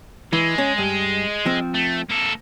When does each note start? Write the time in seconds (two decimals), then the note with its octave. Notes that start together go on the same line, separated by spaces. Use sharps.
0.33 E3 G#3
0.58 C#4
0.78 G2
1.46 F3 C4
1.74 A3
2.10 A#3 A4